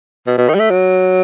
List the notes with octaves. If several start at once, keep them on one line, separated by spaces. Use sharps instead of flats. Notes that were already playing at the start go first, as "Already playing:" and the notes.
B2
B2
D#3
G3
A3
F#3